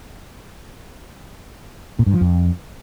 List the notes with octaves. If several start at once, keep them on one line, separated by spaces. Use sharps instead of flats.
A#2
G2
F3
F2